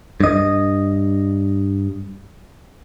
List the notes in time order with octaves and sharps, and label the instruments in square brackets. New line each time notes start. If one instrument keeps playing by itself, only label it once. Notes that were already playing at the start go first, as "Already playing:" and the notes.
[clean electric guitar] G2 D#5